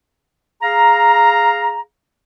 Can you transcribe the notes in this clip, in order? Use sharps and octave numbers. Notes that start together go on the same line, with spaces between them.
G#4 F5 A#5